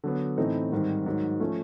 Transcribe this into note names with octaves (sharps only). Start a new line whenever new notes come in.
D3 F#3 B3
A2 E3 A3 C4 D#4
G#2 D#3 G3 C4
G#2 D#3 F#3
F3 A3 C#4